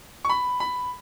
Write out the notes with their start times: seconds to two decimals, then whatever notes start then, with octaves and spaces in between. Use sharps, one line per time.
0.25 C#6
0.30 B5
0.60 B5